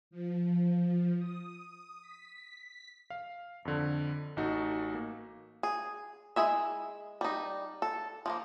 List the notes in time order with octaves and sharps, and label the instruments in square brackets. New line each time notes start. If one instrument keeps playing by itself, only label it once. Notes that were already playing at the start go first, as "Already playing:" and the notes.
[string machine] F3
D#6
B6
[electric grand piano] F5
F2 D3
A1 A3 D#4 F#4
A#3
[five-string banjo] G#4
G#3 E4 G#4 E5
G3 D#4
A4
F3 G#3 A#3